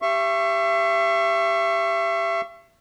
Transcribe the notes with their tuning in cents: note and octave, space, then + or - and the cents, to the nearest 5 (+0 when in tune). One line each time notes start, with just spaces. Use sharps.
G4 +0 E5 +35 C#6 -15